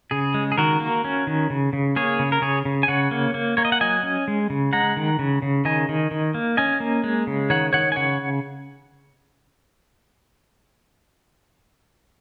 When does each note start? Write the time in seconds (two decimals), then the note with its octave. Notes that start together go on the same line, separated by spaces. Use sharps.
0.11 C#3 G#4
0.34 G#3
0.52 G#4
0.58 D#3 F#4 A#4
0.80 A#3
1.05 C#4
1.27 D#3
1.50 C#3
1.73 C#3
1.96 A#3 G#4 C#5
2.19 C#3
2.32 A#4
2.42 C#3 G#4 C#5
2.65 C#3
2.83 G#5
2.88 C#3 C#5 F#5
3.11 A#3
3.34 A#3
3.57 A#3 C#5
3.65 D#5
3.72 F#5
3.81 F#3 D#5 G#5
4.03 C#4
4.28 G#3
4.50 C#3
4.73 G#3 F#5 A#5
4.97 D#3
5.19 C#3
5.42 C#3
5.65 D#3 D#5 G#5
5.89 D#3
6.11 D#3
6.34 A#3
6.57 C#4 D#5 G#5
6.80 A#3
7.04 G#3
7.27 C#3
7.50 D#3 C#5 F#5
7.73 D#3 C#5 F#5
7.92 G#5
7.96 C#3 C#5 F#5